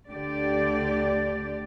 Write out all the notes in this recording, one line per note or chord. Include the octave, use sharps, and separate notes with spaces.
D2 D3 G4 D5